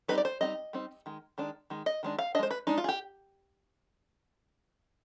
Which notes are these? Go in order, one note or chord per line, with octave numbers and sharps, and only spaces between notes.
G3 C4 D#4 B4
D5
C5
G3 C4 D#4 D#5
G3 C4 D#4
D#3 G#3
D#3 G#3 D4
D#3 G#3
D#5
D#3 G#3 D4
F5
D4 D#5
G#3 C5
B4
G#3 D4 D#4
F4
G#4
G4